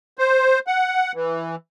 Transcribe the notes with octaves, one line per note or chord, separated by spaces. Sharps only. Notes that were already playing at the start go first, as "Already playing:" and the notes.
C5
F#5
E3